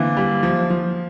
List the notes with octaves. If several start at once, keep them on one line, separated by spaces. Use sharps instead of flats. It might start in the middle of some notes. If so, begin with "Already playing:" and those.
Already playing: D3 E3 A#3 C4
G3
F3
F3